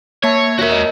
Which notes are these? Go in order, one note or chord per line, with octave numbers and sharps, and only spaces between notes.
A#3 C#5 E5 A5
F#4 A#4 C#5 E5
D#5